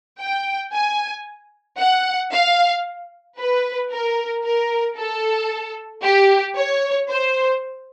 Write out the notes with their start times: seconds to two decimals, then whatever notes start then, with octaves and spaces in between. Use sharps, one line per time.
0.20 G5
0.73 G#5
1.80 F#5
2.33 F5
3.38 B4
3.91 A#4
4.44 A#4
4.97 A4
6.03 G4
6.56 C#5
7.09 C5